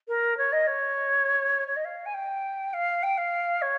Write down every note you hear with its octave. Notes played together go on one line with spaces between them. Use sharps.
A#4
C#5
D#5
C#5
C#5
D#5
F5
G#5
G5
F5
G5
F5
C#5